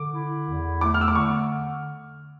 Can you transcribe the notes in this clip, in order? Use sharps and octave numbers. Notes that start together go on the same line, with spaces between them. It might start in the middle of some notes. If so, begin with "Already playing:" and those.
Already playing: D3 D6
E4
E2
A3 D6
F6
E6
D6
D3 C#6